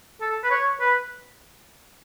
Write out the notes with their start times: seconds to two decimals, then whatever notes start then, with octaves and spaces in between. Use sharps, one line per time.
0.21 A4
0.44 B4
0.51 C#5
0.80 B4